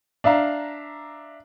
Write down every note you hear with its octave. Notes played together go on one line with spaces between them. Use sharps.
D4 E5 F5 A#5